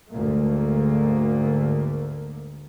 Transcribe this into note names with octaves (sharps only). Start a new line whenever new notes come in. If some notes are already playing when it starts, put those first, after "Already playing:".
D2 G#2 A3 A#3